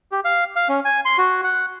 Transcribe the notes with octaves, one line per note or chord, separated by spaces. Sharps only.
G4
F5
F5
C#4
G#5
C6
F#4
F#5